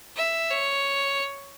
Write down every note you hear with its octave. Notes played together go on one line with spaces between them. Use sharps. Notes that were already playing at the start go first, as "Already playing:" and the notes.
E5
C#5